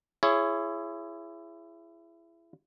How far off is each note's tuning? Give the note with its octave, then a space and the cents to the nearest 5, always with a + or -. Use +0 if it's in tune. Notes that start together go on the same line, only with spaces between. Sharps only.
E4 +25 G#4 +0 C#5 +0